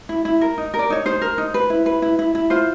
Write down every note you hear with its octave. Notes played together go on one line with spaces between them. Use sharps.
E4
E4
A#4
D#4
A#4
D5
D#4 C#5
D#4 C5
A#4
D#4
B4
E4
B4
E4
E4
E4
F4 C5